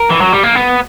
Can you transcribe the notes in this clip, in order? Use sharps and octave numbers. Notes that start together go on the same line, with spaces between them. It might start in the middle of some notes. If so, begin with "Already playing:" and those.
Already playing: A#4
E3
F#3
G3
A#3
B3